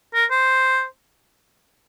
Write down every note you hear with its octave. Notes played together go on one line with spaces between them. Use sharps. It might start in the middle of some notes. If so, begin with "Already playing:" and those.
A#4
C5